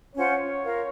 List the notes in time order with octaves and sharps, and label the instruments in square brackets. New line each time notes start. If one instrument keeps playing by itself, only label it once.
[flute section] C#4 F4 C5 F#5 [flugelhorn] C#5
[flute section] F4 A#4 F5